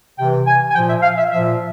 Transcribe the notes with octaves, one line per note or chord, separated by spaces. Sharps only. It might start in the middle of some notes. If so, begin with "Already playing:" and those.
C3 E3 G5
G#5
G#5
A#2 F3 G5
E5
F5
E5
A#2 F3 E5